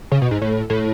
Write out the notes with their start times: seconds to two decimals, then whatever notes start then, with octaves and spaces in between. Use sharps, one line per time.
0.12 C#3
0.22 B2
0.31 G#2
0.42 A2
0.70 A2